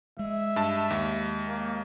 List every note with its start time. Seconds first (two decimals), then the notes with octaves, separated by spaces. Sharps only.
0.19 G#3 E5
0.56 G2 A5
0.90 D#2
1.46 A#3